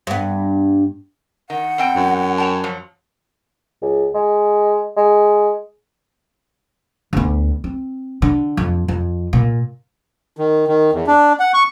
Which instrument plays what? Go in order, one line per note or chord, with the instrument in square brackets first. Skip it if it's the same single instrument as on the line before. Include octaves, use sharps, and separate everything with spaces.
[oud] G2 B3
[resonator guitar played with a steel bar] D#3 [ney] F#5
[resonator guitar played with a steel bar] E2 C4 G5
[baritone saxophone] F#2
[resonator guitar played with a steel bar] C#5 G5 A5
F3 F#3
[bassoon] C#2
G#3
G#3
[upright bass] D2 B3
C4
D3
F2
F2
A#2
[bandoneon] D#3
D#3
E2
D4
F#5
C#6